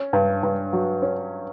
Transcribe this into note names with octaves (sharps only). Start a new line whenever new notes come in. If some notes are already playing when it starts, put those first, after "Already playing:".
Already playing: C#4
G2
G2
F#3
C#4